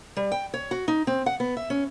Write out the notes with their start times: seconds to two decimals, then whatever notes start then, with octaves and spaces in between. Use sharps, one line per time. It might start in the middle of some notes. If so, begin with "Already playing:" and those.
0.17 G3
0.32 G5
0.54 C#5
0.71 F#4
0.88 D#4
1.07 C4
1.26 F#5
1.40 B3
1.57 E5
1.70 C#4